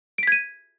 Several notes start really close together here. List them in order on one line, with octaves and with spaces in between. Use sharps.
D7 B6 G#6 D#7